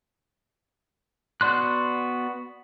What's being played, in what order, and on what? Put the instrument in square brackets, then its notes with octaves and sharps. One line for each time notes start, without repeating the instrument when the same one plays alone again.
[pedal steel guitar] B3 F#4 D5 C6 F#6